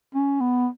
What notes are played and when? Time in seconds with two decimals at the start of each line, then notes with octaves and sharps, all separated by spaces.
0.15 C#4
0.40 B3